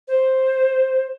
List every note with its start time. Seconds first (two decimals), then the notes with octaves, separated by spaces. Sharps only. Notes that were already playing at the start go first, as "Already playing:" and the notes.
0.08 C5